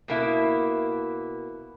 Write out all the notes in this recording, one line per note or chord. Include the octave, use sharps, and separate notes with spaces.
B2 A#3 E4